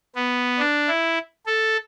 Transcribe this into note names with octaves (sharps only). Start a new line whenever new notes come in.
B3
D4
E4
A4